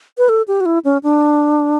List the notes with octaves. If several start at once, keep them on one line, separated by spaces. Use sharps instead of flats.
B4
A4
G4
F#4
E4
C#4
D4